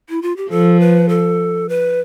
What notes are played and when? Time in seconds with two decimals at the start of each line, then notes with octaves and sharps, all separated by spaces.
0.09 E4
0.22 F4
0.37 G4
0.50 F3 A4
0.80 B4
1.09 A4
1.69 B4